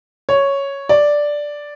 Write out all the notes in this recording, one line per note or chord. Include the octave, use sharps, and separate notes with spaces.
C#5
D5